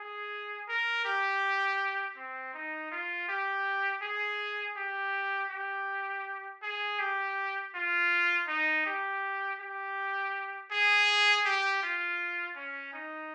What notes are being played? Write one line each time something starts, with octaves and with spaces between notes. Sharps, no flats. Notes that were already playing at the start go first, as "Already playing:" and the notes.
Already playing: G#4
A#4
G4
C4
D#4
F4
G4
G#4
G4
G4
G#4
G4
F4
D#4
G4
G4
G#4
G4
F4
C#4
D#4